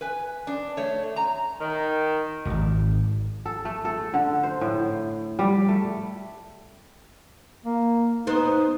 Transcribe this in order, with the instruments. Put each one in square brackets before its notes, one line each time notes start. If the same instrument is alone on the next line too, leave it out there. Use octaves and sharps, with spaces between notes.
[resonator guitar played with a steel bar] B4 G#5
D4
A3 C#5
A#5
[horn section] D#3
[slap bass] D1 G#1
[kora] A4
A3
A4
D3
C5
A2
G3
A3
[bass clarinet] A#3
[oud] B3 C5 [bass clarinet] D#4